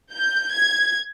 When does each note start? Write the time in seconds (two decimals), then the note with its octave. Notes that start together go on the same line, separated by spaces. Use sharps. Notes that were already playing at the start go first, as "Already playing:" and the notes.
0.14 G6
0.54 G#6